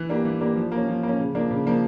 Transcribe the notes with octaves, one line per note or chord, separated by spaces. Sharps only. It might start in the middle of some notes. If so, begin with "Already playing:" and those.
Already playing: E3
A#3 D4 G4
E3
A#3 D4 G4
F3
A#3
C#4
F3
A#3 C#4
C#3
F3 A#3 D4
C#3
F3 A#3 D4